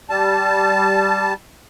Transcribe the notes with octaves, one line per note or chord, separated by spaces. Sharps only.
G3 A5